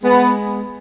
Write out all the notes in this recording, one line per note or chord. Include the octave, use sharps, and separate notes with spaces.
G#3 B3